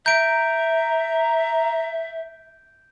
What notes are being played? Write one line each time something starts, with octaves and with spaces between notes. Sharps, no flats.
E5 A#5 G6 D7